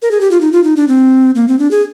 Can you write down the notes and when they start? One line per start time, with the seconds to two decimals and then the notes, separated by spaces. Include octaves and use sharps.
0.02 A#4
0.11 G#4
0.21 G4
0.31 F4
0.41 D#4
0.52 F4
0.64 D#4
0.76 D4
0.88 C4
1.35 A#3
1.48 C4
1.59 D4
1.71 G#4